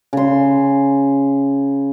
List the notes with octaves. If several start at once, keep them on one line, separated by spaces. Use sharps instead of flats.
C#3 C6